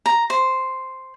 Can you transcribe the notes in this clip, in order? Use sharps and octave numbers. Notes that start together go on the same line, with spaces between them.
A#5
C5